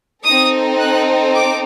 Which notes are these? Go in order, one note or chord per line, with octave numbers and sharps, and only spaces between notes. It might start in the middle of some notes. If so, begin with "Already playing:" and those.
C4 D#4 A4 D#6
F#6
D6